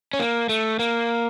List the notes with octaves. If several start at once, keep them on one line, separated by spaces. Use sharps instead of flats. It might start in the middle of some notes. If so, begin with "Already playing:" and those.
C#4
A#3
A3
A#3